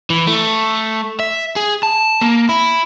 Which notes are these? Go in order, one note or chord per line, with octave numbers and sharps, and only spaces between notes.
E3
A3
E5
G#4
A5
A#3
E4